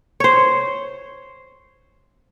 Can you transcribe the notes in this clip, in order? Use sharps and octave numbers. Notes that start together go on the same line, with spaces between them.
C5 C#5